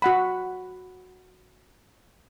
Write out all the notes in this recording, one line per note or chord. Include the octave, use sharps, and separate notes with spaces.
F#4 F#5 B5